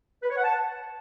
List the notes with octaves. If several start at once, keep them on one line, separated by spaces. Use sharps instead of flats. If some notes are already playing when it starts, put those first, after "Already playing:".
B4
C#5
F#5
A5